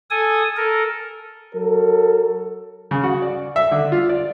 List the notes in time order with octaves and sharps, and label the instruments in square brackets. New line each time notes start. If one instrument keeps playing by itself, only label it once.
[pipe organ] A4 G#5 D#6
A4 A#4
[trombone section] F#3 A4 A#4
[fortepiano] C#3
F#4
D5
E5
D3
F4
D5